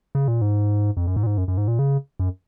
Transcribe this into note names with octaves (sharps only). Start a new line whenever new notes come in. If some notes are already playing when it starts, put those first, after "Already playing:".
C#3
A#2
G#2
F2
F#2
G#2
A#2
G#2
F#2
F#2
G#2
A#2
C#3
F#2